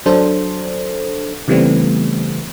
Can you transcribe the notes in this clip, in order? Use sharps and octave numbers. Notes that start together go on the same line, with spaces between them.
F#3 D4 A4 C5
C#3 E3 G3 A3 B3 C4